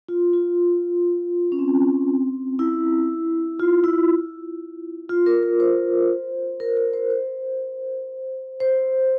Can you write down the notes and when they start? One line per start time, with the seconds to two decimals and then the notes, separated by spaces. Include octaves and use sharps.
0.09 F4
0.33 F4
1.52 C#4
1.59 C4
2.59 E4
3.59 F4
3.84 E4
5.09 F4
5.26 A#4
5.43 A#4
5.60 C5
6.60 A#4
6.77 A#4
6.93 C5
7.10 C5
8.60 C5